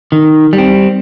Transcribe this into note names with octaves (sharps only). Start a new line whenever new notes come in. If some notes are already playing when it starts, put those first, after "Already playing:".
D#3
G3
C4